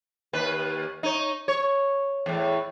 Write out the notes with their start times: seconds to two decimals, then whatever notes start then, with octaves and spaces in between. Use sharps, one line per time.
0.33 D#2 B4
1.03 D#4 C#5
1.48 C#5
2.26 E2 A2